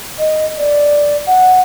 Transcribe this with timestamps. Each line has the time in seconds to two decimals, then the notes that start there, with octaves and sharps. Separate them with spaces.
0.19 D#5
0.58 D5
1.27 F#5